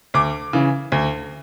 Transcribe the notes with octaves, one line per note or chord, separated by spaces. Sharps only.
D2 D6
C#3 E3
D2